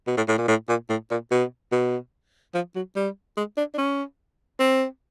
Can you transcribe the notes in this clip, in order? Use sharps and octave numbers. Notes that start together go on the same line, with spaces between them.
B2
A2
A2
A#2
A2
A#2
A2
A#2
B2
B2
F3
F#3
G3
G#3
D4
D4
C#4
C4